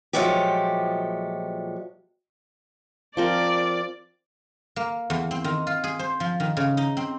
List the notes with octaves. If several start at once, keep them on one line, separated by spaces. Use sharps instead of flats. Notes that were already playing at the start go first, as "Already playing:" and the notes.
A#2 F3 F#3 G#3 A3 G4
F3 C4 A#4 D5
A#3
E2
C4
D#3
F4
G#4
C5
F3
D#3
C#3
D#4
C4